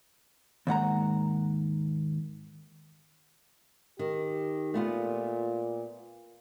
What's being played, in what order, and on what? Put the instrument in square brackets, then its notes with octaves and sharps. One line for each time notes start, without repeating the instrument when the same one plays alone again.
[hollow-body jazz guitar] D#2 G#2 F#5 A#5
[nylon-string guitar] D#3 [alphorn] G4
[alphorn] A#2 [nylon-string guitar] A3 B3 F4